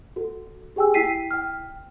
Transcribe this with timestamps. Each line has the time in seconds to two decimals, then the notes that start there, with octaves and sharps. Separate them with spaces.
0.16 F#4 A4
0.76 G4 G#4 G5 G#5 E6
0.94 E4 G5 B6 C7 D#7
1.31 G5 F6